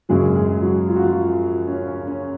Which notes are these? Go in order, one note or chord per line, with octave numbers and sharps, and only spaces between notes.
F#2 C#3 F#3 G#3 G#4
G#3 G#4
F#3 F#4
F4
F#4
F3 F4
C#4
C#4
C#4